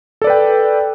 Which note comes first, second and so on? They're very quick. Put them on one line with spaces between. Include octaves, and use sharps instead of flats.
A4 D5 B4 G5